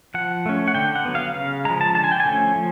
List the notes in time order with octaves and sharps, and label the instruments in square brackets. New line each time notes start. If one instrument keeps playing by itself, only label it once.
[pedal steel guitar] F3 F#5
A3 C#4
F#5
D3 G5
F#5
F#3 B3
F5
C#3 F5
F3 G#3 A#5
A5
D3 A5
G#5
G5
G#5
F3 A3 C#4
F3